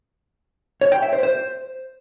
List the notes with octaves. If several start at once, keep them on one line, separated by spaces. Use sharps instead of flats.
C#5
G5
E5
C5
C5